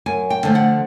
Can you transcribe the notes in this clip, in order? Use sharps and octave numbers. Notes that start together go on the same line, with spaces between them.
F#2 G#5
G5
D3 F3 A3
F#5